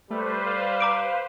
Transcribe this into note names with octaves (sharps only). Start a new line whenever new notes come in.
G3 A3 B4 C5
F5
A#5 D6 D7